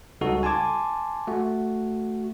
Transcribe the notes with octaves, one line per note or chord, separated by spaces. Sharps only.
C#2 C#3 G3 D#4 F#4 A4
G#5 A5 C6 D6 G#6
A3 F#4